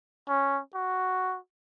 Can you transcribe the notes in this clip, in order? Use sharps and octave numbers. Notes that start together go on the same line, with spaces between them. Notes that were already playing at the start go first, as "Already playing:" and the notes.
C#4
F#4